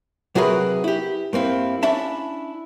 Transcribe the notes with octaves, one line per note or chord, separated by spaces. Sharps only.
C3 F#3 F#4 G#4 A#4 B4
E4 G4
G2 A#3 C4 E4
C#4 D4 E4 E5 A5